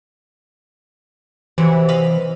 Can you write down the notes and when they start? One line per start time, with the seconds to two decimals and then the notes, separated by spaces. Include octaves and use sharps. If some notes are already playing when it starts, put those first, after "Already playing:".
1.58 C3 E3 F#3
1.88 D#5 F5 B5